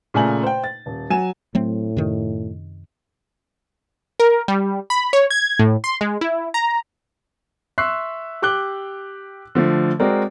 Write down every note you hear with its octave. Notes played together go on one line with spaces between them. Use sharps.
A#2 C#3 A3 G#5 A#5 F#7
C5 G5
A6
D#1
F#3 G#5 D#7 E7
A2 F#3 A3 C4
F#2 C3 D#3
A#4
G3
B5
C#5
G#6
A2
C6
G#3
E4
A#5
E5 C6 C#6 E6 F#6 C7
G4 D6 F#6 G7
D3 F3 A3
G#3 C4 F#4 A#4 D5